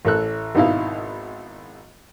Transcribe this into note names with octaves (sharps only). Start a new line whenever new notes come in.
A1 A4 F#6
G#1 B2 D#4 E4 F5